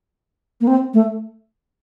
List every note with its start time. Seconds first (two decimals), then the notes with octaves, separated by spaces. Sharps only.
0.61 A#3
0.67 C4
0.94 A3